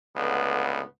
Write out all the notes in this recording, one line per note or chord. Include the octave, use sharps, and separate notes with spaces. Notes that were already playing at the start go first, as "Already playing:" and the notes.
C#2 A2 D3 B3